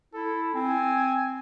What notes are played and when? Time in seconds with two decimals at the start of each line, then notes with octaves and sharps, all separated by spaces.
0.14 E4 A4
0.54 C4 G#5